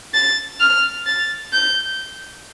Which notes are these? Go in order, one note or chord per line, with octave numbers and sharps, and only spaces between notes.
A6
F6
A6
G6